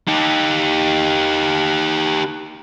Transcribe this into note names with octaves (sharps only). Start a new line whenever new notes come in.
D#4 G4